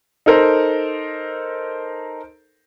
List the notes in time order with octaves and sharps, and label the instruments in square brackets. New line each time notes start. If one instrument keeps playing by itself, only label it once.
[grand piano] D#4 A4 A#4 C5